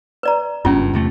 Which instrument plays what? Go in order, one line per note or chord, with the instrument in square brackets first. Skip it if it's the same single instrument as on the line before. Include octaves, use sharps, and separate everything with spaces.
[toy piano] B4 D5 A#5
[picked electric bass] F#1 G2 [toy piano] C#4 F4
[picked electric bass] E2 C3 A3